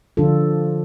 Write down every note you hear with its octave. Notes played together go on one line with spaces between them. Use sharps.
D3 F3 D4 F4 A4